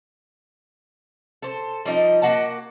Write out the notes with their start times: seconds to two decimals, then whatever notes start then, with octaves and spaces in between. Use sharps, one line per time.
1.42 A4 C5
1.85 F3 G3 D#4 D#5
2.22 A#3 F#4 F#5 A5